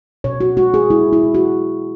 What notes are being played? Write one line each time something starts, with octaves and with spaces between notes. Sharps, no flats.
B2 C#5
F#4
G#3 F#4
G#4
G#3 E4
E4
B2
F#4